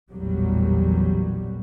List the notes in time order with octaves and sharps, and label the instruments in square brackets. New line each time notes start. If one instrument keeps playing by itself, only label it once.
[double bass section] A1 E2 A#2 F#3 G3